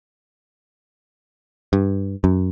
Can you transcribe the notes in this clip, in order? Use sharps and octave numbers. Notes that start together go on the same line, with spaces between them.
G2
F#2